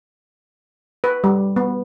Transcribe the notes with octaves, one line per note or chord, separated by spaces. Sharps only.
B4
G3
B3